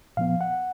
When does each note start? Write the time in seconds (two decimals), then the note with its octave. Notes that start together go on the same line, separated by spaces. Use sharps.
0.17 A#2 F3 B3 F5
0.41 F#5